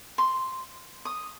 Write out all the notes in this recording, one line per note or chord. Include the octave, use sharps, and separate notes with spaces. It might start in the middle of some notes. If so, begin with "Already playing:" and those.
C6
D#6